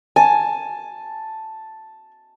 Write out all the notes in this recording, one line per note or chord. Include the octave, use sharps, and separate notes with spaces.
G#5 A5